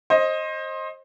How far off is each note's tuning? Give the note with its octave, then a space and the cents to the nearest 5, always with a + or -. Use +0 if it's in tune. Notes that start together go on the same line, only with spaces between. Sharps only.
C5 +25 D#5 +5